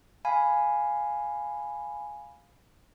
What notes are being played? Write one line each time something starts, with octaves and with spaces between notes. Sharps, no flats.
F5 G#5 B5